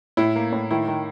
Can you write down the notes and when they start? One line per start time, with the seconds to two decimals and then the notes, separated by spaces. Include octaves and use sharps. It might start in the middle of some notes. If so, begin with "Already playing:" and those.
0.17 A2 E4
0.36 A#3
0.52 A2
0.71 D#3 E4
0.88 D#3